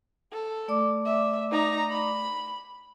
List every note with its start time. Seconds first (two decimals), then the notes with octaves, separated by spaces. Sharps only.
0.32 A4
0.68 A3 D5 D6
1.06 E5
1.52 D#4 A#5
1.91 B5